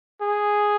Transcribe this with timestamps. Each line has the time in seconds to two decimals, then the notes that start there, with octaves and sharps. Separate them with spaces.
0.21 G#4